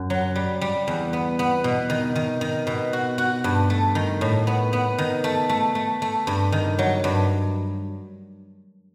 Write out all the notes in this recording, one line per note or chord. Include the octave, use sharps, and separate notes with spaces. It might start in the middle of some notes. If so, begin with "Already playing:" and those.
Already playing: F#2
F#3
G3
G3
E2
B3
B3
B2
D#3
D#3
D#3
B2
F#4
F#4
G2
A3
D#3
A2
B3
B3
D#3
A3
A3
A3
A3
G2
D#3
F#3
G2